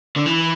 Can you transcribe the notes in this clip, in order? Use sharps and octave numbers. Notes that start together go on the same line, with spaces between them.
D3
E3